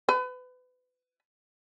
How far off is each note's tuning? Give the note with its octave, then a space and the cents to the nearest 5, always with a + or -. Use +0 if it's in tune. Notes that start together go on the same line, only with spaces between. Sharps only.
B4 +30